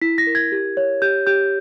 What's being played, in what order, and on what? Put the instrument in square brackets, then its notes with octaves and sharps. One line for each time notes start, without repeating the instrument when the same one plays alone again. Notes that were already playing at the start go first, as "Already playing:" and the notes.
[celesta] E4 B6
A#6
A#4
G#6
G4
C#5
G4 G6
G4 G6